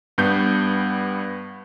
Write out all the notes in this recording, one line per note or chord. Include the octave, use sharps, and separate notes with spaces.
G2 G3 B3 G6